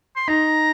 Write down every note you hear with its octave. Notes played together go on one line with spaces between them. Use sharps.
C6
D#4 A#5